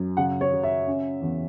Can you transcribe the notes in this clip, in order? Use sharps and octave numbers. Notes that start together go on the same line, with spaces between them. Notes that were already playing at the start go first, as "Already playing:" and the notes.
Already playing: F#2
C#3 F#5
C#5
C#3
E5
C#4
E2